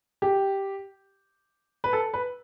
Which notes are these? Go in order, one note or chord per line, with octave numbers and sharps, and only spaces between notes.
G4
B4
A4
B4